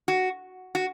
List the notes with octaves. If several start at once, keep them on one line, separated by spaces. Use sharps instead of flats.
F#4
F#4